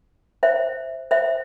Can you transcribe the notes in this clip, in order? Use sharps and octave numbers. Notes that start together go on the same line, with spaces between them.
C5 E5
C5 E5